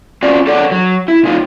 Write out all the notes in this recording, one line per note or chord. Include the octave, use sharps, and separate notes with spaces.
C#4 F4 F#4 D5
D4 G#4 A4 C#5 D5 F#5
F#3
E4
A#2 D#4 F4